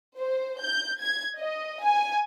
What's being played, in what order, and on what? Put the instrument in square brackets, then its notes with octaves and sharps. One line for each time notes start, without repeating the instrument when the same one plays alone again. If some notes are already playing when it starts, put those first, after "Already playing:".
[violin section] C5
G6
G#6
D#5
G#5